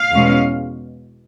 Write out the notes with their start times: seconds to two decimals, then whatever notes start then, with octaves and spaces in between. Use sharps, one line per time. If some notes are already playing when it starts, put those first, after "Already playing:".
Already playing: F5
0.14 E2 B2 G#3 C#4